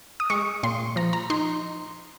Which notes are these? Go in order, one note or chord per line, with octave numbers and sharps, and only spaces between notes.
D#6
G#3 C#6
A#2 C6
F3 A#5
A#5
D#4 C6